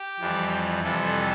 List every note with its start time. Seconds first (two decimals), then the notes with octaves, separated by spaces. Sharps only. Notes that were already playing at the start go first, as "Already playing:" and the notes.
Already playing: G4
0.20 F2 E3 G3
0.83 F2 C3 E3 G3 A4